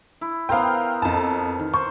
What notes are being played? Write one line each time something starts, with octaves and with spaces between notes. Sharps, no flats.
E4
B3 A#4 C5 F5 G5
F2 A5
D#3
C5 C#6